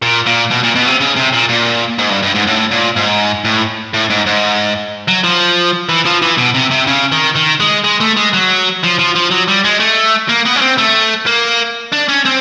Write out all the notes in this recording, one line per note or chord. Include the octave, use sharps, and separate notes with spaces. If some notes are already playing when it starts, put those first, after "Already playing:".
A#2
A#2
B2
A#2
B2
C3
C#3
C3
A#2
A#2
G#2
G2
G2
G#2
A2
A#2
G#2
A2
A2
G#2
G#2
F#3
F3
E3
F3
E3
B2
C3
C3
C#3
D#3
D#3
G#3
G#3
A3
G#3
F#3
F3
F3
F3
F#3
G3
G#3
A3
A#3
B3
C#4
C4
A3
A#3
D4
C#4
C4